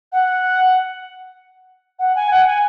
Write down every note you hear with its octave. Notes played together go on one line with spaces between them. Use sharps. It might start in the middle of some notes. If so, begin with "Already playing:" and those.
F#5
F#5
G#5
F#5
G#5